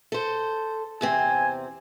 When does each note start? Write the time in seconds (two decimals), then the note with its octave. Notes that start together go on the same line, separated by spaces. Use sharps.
0.12 A4 C5
1.01 E2 C3 C4 G#5